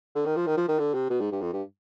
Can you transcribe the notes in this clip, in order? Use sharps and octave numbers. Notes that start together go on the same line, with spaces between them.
D3
D#3
F3
D#3
F3
D#3
D3
C3
B2
G#2
G2
F2
G2